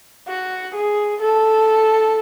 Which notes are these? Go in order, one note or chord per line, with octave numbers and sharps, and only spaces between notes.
F#4
G#4
A4